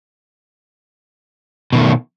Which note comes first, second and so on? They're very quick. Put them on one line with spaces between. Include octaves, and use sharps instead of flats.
B2 D#3 A3